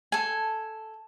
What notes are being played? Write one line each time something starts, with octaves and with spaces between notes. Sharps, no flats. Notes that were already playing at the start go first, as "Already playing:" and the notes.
A4 G#5